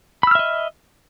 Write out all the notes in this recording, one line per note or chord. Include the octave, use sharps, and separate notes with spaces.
D#5 E5 B5 E6 F6